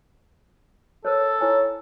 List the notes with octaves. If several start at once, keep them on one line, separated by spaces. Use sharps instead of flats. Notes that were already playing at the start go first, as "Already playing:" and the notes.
A4 A#4 C5 C#5
E4 C5 C#5 G#5